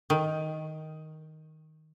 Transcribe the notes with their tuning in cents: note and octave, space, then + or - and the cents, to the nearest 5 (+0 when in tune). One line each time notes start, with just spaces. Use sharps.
D#3 +5